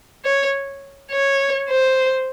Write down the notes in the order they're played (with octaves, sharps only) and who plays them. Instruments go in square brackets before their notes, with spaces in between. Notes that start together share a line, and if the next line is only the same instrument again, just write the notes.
[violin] C#5
C#5
C5